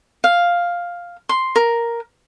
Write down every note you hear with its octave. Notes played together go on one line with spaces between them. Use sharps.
F5
C6
A#4